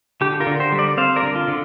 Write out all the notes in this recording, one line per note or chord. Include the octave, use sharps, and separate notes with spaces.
D3 G4
F4 A#4
D3
G4 C5
G3
A#4 D5
C4 C5 F5
A#4 D5
D3
F4
D3